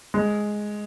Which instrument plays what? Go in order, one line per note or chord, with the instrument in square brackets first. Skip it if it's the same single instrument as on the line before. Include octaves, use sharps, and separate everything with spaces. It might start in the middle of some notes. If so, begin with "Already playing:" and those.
[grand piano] G#3